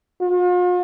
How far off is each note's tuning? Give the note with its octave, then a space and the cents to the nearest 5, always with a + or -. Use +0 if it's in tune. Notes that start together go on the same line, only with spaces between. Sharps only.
F4 +45